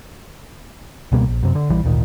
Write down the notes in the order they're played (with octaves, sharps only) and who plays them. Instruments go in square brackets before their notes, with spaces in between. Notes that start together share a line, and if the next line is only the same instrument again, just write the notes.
[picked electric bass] C#2 B2 G3 A#3
A#1
F#2 C3
D3
A#1 E3 G3
G#1 D2 A#2 D#3